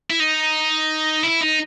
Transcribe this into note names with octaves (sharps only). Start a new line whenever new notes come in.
E4
D#4
E4
D#4